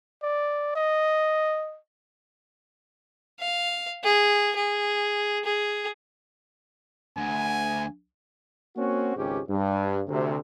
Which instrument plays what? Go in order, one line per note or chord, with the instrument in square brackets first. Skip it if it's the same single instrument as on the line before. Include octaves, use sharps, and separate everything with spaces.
[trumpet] D5
D#5
[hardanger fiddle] F5
G#4
G#4
G#4
[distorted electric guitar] D2 [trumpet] G#5
[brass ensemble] A#3 C4 C#4 F#4
G#1 C#2 G#2 C#4 G4
G2
D2 C3